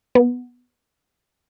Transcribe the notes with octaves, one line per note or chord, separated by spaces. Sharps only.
B3